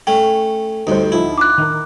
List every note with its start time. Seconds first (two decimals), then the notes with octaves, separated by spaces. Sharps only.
0.07 A3 C#4 G5
0.87 D2 G2 D#4 C5
1.12 D2 F3 D#4 E4
1.38 D6 F#6
1.58 D#3 A#4